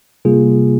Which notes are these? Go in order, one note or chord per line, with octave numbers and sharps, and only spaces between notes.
C3 G3 A#3 F4 G#4